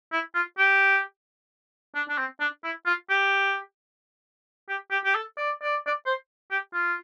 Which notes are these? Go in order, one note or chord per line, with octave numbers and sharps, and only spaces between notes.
E4
F4
G4
D4
D4
C4
D4
E4
F4
G4
G4
G4
G4
A4
D5
D5
D5
C5
G4
F4